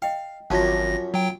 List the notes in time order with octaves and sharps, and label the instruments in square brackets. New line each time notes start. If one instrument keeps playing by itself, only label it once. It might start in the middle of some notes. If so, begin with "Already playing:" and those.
[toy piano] D#5 G5 [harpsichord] F5
[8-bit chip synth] G#1 A#6 [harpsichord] F#2 F3 C#4 [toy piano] F4 F#4 A5
[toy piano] D6
[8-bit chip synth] F#3 G5